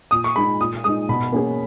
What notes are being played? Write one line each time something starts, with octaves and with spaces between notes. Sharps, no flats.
A#2 D#6
C#6
G#3 D#4 B5
A#2 D#6
G#3 D#4 D#6
B2 B5
A#3 C#4 G#4